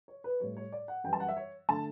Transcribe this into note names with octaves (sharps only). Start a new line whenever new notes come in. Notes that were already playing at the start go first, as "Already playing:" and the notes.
C#5
B4
A2 G3 C#5
C#5
D5
F#5
F#2 E3 G3 G5
A5
F#5
E5
C#5
D3 A3 A5